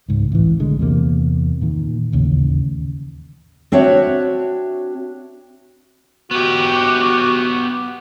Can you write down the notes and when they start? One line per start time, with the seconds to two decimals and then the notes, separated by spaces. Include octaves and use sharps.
0.09 C#2 G#2
0.32 A1 E3
0.59 B1 D3 G#3
0.79 E2 C3 F3 A#3
1.62 A#2 D#3
2.13 A1 D#2 C#3
3.72 C4 D4 F#4 C#5 E5
6.31 B3 F#4 G4